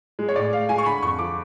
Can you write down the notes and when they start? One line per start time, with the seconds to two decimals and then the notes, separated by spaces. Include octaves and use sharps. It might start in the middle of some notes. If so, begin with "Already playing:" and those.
0.19 G#3
0.29 C#5
0.36 A2 D5
0.53 A2 F5
0.69 G#3 G#5
0.78 C#6
0.86 D3 B5
1.03 F2 C#6
1.19 F3 D6